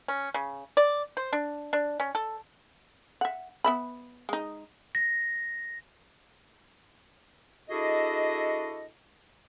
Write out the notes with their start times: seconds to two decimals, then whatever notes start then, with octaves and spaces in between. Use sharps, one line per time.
0.08 C#4
0.34 C#3
0.77 D5
1.17 C5
1.33 D4
1.73 D4
2.00 C#4
2.15 A4
3.21 E5 F#5
3.64 B3 E5 B5
4.29 G#3 D#4
4.95 A#6
7.70 D4 E4 F#4 G#4 A4 D#5